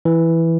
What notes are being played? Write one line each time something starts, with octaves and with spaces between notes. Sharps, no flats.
E3